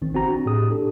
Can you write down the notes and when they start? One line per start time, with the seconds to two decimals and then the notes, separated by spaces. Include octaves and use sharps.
0.02 A#1 D#3 C4
0.13 G#1 C4 F#4 A#5
0.28 D4
0.46 A2 G4 G#4 D#6
0.70 D4 G4 A4